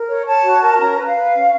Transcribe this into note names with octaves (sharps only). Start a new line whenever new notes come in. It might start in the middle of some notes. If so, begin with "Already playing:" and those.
Already playing: A#4
C#5
C#5 A5
F#4
A#4
C#4 A#5
B4
F5
B4
C#4